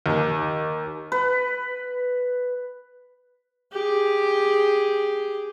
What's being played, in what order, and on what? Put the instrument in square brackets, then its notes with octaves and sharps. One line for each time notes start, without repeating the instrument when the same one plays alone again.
[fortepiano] D#2
[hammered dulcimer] B4
[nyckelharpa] G4 G#4